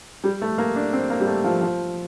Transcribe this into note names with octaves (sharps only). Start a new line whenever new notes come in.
G3
A3
A#3
D4
C4
A#3
G3
A3
F3
F3